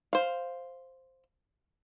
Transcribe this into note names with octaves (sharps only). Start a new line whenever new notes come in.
C5 F5